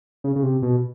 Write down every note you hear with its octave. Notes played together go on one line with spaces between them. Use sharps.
C#3
C#3
C3
B2